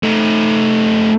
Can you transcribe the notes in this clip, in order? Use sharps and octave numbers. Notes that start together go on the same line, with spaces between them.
A3 D#4